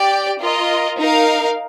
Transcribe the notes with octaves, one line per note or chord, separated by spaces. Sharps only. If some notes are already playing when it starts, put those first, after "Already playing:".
Already playing: G4 D5 G5
F4 A#4 D#5
D#4 A#4 F5